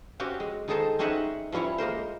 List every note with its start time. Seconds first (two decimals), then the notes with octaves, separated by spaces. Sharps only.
0.20 C4 C#4 F#4 G4
0.40 G#3
0.68 D#3 G#3 D#4 G#4 A4 C5
0.99 C4 C#4 D#4 G#4 E5 F#5
1.52 F3 G3 C#4 E4 C#5
1.78 G#3 A#3 A#4 C5